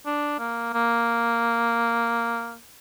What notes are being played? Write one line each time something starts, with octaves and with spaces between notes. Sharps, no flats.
D4
A#3
A#3